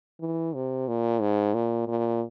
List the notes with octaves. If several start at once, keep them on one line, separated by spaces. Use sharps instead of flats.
E3
C3
A#2
G#2
A#2
A#2